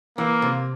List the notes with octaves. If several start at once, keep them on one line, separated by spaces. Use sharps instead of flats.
E3 A#3
C3